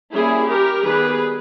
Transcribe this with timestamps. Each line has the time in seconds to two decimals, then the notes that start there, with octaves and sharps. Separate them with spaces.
0.14 G3 A#3 C#4 E4 G#4
0.49 G4 A#4
0.84 D#3 G3 B3 G#4 B4